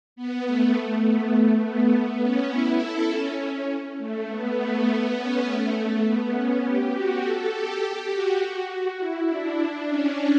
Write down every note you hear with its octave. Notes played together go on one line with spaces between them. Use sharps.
B3
A3
A3
B3
A3
B3
B3
C#4
E4
A4
C#4
A3
B3
A3
B3
C#4
A3
B3
C#4
G4
F#4
A4
G4
F#4
F#4
E4
D4
C#4